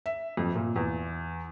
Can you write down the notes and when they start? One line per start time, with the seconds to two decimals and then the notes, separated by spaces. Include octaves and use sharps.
0.06 E5
0.37 F2
0.55 A#2
0.76 E2